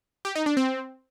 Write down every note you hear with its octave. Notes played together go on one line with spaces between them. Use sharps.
G4
D#4
D4
C4